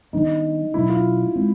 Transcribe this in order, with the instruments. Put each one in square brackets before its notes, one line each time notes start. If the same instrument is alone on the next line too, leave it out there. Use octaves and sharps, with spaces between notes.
[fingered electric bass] D#3 G3 B3 D4 [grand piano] D#4
[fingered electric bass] B2 F#3 A3 C#4 [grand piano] E4
[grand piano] F4
[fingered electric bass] G#3 C4